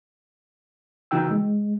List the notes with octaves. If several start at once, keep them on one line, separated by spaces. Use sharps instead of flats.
C#3 E3 D#4 F#4 G5 E6
G#3